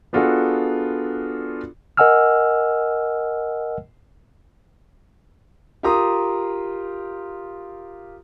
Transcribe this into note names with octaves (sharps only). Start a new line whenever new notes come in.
B3 D4 F4 F#4 G#4 A4
A#4 D#5 F#5 G#5 E6 F6
F4 G4 A#4 A#5 C6 D#6